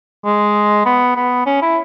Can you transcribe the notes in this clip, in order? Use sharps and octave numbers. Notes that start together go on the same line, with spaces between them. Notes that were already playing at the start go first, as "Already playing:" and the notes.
G#3
B3
B3
C#4
E4